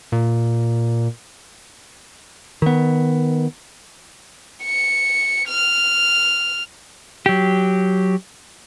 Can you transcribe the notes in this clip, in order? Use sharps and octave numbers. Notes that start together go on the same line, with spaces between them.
A#2
D#3 B3
C#7
F6
F#3 G4